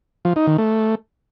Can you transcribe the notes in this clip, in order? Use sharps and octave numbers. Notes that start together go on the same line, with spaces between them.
F3
D#4
D#3
A3